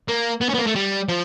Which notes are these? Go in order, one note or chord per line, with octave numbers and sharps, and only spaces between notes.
A#3
B3
C#4
B3
A#3
A3
G3
F3